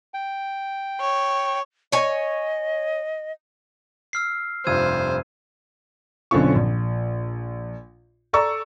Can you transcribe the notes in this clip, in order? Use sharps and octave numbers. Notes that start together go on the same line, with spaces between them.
G5
C#5
C#5 D#5 G#5
E6 F6 C7
F1 G2 F4 C5 E6 G#6 D#7
B1 D3 C4 C#4 F4 C#6
A#1
A4 D5 A#5 C#6 E6